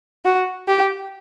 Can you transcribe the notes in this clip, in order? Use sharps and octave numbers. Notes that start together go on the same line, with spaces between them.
F#4
G4